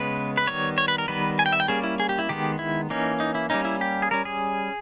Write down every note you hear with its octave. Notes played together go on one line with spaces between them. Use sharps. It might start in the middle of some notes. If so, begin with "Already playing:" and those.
Already playing: C#3 G#3 B3 B4
B4
D#3 G3 B3 C#5
C#5
B4
A#4
D#3 G3 B3 B4
G#5
G5
E5
G5
G3 A#3 C#4 G#4
E4
G#4
G4
E4
D#3 G#3 B3 G4
E4
E3 A#3 C#4 D#4
D#4
E4
G3 A#3 C#4 D#4
E4
G4
G#4
G3 C#4 A#4
G#4